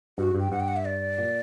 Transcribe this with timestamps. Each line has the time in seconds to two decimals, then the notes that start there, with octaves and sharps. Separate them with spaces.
0.18 G2 F#4
0.35 G2
0.40 G5
0.51 G2 F#5
0.60 G5
0.68 F#5
0.76 E5
0.85 D5
1.18 A#2